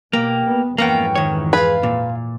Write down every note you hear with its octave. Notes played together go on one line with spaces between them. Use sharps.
B2 A#3 G4
B3
F2 G#2 E3 A#3 B3 C#4 F#4 G5
D#3 C#5
F4 G#4 B4 F5
A#2